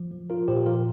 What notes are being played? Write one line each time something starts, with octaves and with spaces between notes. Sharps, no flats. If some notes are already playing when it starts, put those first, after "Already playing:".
Already playing: F3
F3
F3 F4 A#4
A#2 G4 C5
F3 F4 A#4